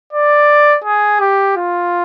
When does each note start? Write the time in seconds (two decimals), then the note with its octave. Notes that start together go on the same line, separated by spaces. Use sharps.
0.13 D5
0.84 G#4
1.20 G4
1.57 F4